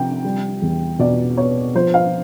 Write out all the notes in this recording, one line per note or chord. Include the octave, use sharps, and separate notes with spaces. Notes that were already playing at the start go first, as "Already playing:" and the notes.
Already playing: C3 F3 G5
G3
E2
B2 D5
B3 C#5
F3 C5
F5